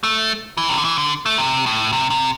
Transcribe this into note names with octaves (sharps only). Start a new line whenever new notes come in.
A3
E3
C3
D3
E3
D3
A3
C3
A2
C3
C3